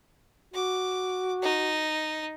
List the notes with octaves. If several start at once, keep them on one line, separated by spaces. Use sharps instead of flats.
F#4 D6
D#4